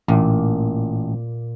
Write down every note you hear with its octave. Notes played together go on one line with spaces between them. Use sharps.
A1 A#2